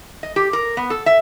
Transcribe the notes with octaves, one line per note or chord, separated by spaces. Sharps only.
D#5
G4
A#4
B3
A4
E5